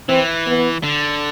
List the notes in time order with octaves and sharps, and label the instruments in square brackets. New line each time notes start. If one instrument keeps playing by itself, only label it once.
[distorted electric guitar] E3 [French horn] C4
[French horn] B3
[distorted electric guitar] D3